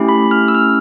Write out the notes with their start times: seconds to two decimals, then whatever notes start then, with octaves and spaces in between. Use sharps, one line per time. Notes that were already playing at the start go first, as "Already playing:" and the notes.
Already playing: A3 C#4 E4 G4
0.09 B5
0.31 F6
0.48 E6
0.55 F6